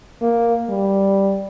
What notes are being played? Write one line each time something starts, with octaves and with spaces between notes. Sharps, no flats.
A#3
G3